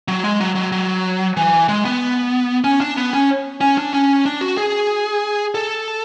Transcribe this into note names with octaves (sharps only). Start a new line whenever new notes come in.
F#3
G#3
F#3
F#3
F#3
E3
G#3
B3
C#4
D4
B3
C#4
C#4
D4
C#4
D4
F#4
G#4
A4